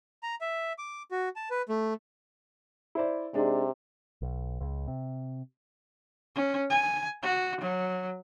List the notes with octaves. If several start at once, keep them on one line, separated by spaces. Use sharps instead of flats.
A#5
E5
D6
F#4
A5
B4
A3
E4 C5 D5
C3 G#3 D4 D#4
B1
C#2
C3
C#4
G#5
F#4
F#3